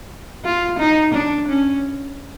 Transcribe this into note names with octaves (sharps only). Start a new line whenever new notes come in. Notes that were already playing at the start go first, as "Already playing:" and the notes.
F4
D#4
D4
C#4